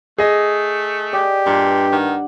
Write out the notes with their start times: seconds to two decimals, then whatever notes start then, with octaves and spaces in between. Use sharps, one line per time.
0.18 A3 G#4 D#5
1.13 G4 D5
1.46 G2 A#2
1.92 D#3 F#5